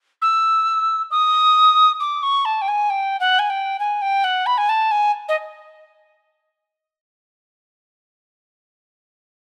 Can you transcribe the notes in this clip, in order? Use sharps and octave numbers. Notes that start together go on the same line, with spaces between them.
E6
D#6
D6
C#6
A5
G5
G#5
G5
F#5
G#5
G5
G#5
G5
F#5
B5
G#5
A5
G#5
D#5